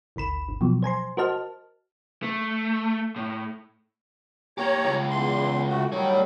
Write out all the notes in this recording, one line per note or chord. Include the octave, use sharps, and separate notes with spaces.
G#1 D2 B5 E7
G1
B2 F3 F#3
C5 G#5 A#5 C6
F#4 A#4 C5 D#5 A5 F6
A3
A2
A#3 G4 C#5 A#5
C#2
E2 C6
A3 F#4
D#3 F#3 G3 A3 C#5